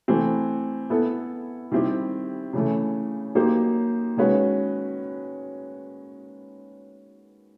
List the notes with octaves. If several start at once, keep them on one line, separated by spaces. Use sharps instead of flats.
E3 A3 C4
B3 E4 A4
D#3 G3 C4 E4 G4
C#3 E3 A3
F#3 A#3 D#4 G4 C5
D#3 G#3 C#4 F#4 B4